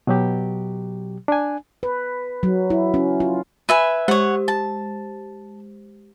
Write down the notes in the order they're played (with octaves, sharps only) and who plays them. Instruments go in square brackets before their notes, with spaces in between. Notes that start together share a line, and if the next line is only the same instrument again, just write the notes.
[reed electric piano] B2 F#3 G4
D4 G#5
[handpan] B4
F#3
E4
C#4
F4
[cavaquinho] B4 E5 G#5
[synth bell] G#3 G4 C5 [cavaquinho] C#5 F#5
[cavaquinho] A5